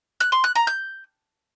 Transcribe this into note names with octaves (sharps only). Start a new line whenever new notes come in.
F#6
C6
F#6
A#5
G6